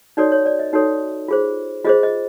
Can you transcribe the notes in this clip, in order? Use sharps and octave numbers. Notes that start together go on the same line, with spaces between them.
D#4 F#4 A4 C#5 D5
C#5
D5
D#5
D#4 F#4 A4 C#5
F4 G#4 C5
F4 G#4 C5 D#5
D#5